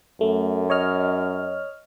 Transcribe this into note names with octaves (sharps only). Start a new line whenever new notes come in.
F#2 A3
C#5 D#5 F6